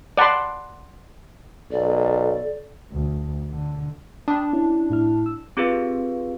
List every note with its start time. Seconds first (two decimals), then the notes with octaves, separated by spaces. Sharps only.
0.17 D5 F#5 A5 B5 C6
1.72 B1 A4 D5
2.90 D2
3.51 D3
4.28 D4 G5 B5 D#6
4.53 C#4 E4
4.90 A2 E4 F6
5.26 E6
5.57 C4 F4 G4 G#4 B4 F5